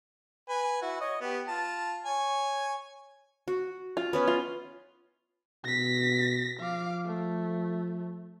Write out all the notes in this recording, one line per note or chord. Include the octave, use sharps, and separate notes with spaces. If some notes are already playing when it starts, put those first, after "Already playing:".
B4 G#5
E4 F#4
C#5 D#5
B3 G4
F4 A5
C#5 G#5
F#4
F4
B3 C#4 B4
F4
B2 A#6 B6
F3 F5 D6
A3